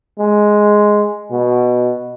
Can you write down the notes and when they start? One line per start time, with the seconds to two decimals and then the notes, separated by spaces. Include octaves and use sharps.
0.19 G#3
1.31 B2